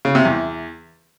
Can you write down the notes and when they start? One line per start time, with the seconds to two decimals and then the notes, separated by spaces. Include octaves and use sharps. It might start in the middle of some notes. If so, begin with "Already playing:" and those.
0.05 C#3
0.15 C3
0.25 E2